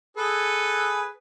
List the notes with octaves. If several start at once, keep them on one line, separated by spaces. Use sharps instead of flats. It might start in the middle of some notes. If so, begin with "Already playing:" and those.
G#4 A4 B4